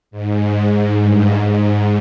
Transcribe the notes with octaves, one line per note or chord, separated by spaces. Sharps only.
G#2
G2
G#2
G#2